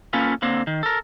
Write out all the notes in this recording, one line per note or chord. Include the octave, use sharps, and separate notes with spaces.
A#3 C#4 F4 A4 B4
D3 A#3 C4
D#3
A4 A#4